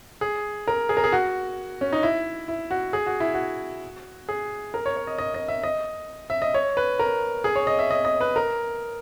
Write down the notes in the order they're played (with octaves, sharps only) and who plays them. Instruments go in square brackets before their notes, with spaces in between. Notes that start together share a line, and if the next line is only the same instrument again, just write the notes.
[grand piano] G#4
A#4
G#4
A#4
G#4
F#4
C#4
D#4
E4
E4
F#4
G#4
F#4
E4
F#4
G#4
A#4
C#5
C#5
D#5
D#5
D#5
E5
D#5
E5
D#5
C#5
B4
A#4
G#4
C#5
D#5
E5
D#5
D#5
B4
A#4